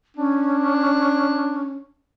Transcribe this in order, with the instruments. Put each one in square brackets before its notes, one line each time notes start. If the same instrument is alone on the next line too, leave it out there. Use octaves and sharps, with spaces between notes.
[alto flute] C#4 [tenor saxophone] D4